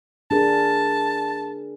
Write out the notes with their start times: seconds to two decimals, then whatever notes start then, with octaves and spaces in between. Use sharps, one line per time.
0.31 D4 G#4 A#4 A5